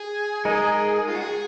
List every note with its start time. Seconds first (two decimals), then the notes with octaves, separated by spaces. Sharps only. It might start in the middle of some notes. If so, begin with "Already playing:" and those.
Already playing: G#4
0.45 G#3 D#4 A#4 D#5
1.08 F4
1.15 F#4
1.22 G#4